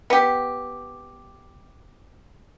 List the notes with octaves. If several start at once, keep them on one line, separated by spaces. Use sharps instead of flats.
B3 G4